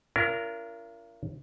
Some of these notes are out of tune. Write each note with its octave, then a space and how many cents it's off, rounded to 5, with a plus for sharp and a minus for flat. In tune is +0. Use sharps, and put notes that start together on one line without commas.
D4 -45 F4 -40 A#4 -5